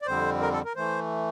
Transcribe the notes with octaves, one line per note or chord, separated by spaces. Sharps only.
D5
F2 D3 G3 C4 C5
A#4
A4
A#4
E3 A3 C5